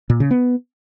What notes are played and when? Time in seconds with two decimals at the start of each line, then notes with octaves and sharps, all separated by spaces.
0.10 A#2
0.20 C#3
0.31 B3